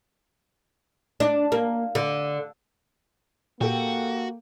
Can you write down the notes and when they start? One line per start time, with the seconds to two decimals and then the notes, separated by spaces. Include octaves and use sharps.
1.20 D4
1.52 A#3
1.95 D3
3.61 A#2 A#3 F#4 G4 A4 G5